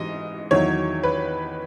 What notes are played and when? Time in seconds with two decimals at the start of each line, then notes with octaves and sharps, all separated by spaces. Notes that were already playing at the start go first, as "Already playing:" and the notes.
Already playing: G#2 E3 D#5
0.51 E2 D#3 F#3 C#5
1.03 B4